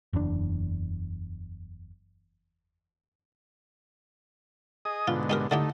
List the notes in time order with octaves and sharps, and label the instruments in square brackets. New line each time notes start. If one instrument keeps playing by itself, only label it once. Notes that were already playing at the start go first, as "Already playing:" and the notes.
[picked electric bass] F#1 E2 A#2 D4
[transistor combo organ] G#4 D#5 D#6
[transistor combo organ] G#2 B2 D3 [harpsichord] F4
[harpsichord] D#4 G4 A#4
[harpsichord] D3 E4 G4 [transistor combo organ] A3 D#4